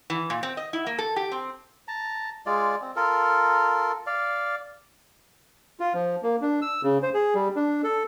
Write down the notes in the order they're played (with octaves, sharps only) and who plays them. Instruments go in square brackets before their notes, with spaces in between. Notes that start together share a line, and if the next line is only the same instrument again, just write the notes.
[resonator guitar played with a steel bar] E3
A#2
C4
D#5
E4
A#3
A4
G4
C4
[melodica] A5 A#5
G#3 F4 D5
C4
F4 A4 A#4
D5 F5
[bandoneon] F4
F3
A#3
D4
E6
C#3
C5
G#4
G3
D4
A4